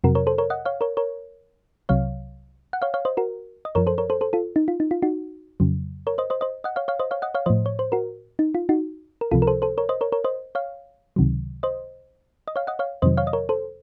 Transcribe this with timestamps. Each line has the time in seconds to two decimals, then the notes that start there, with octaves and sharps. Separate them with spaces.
0.04 F2 C3 F#3 F#4 A#4
0.15 A#4 C#5
0.27 A4 C5
0.38 A#4 C#5
0.50 D#5 F#5
0.65 C#5 F5
0.81 A#4 C#5
0.97 A#4 C#5
1.89 C2 C3 F#3 C#5 F5
2.73 F#5
2.82 C#5 F5
2.94 C#5 F5
3.05 C5 D#5
3.17 F#4 A#4
3.65 D#5
3.75 F#2 F3 A#4 C#5
3.87 A4 C5
3.98 A#4 C#5
4.10 A4 C5
4.21 A4 C5
4.33 F4 A4
4.56 D#4
4.68 F4
4.80 D#4
4.91 F4
5.02 D#4 F#4
5.60 F2 C#3 F#3
6.07 A#4 C#5
6.18 C5 D#5
6.30 C5 D#5
6.41 C5 D#5
6.64 D#5 F#5
6.76 C#5 F5
6.88 C#5 F5
6.99 C5 D#5
7.11 C#5 F5
7.22 D#5 F#5
7.35 C#5 F5
7.46 A2 F3 C5 D#5
7.66 C#5
7.79 C5
7.92 F#4 A#4
8.39 D#4
8.55 F4
8.69 D#4 F#4
9.21 A#4
9.31 C#2 C3 F3 F4 A4
9.42 A#4
9.47 A4 C5
9.62 A4 C5
9.78 A#4 C#5
9.89 C5 D#5
10.01 A#4 C#5
10.12 A#4 C#5
10.24 C5 D#5
10.55 C#5 F5
11.16 C#2 C3 D#3 F#3
11.63 C5 D#5
12.48 D#5
12.56 C#5 F5
12.67 D#5 F#5
12.79 C#5 F5
13.02 F2 C3 D#3 F#3 C5 D#5
13.17 C#5 F5
13.27 D#5
13.33 A#4 C#5
13.49 A4 C5